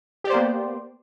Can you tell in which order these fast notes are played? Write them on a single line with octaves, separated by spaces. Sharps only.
G4 D5 C5 A#3 B3